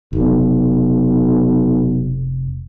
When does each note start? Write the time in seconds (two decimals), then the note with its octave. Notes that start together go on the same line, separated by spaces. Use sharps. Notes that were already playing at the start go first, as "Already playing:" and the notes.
0.13 F1 B1